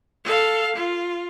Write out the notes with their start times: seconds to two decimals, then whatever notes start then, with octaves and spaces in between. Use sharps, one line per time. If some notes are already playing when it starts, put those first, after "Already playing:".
0.24 A4 F5
0.75 F4